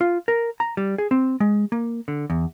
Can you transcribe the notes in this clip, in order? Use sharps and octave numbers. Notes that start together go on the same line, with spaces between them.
F4
A#4
A#5
G3
G#4
C4
G#3
A#3
D3
E2